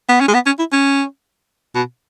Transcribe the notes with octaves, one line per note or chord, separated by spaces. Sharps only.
B3
C#4
G#3
B3
C#4
E4
C#4
B2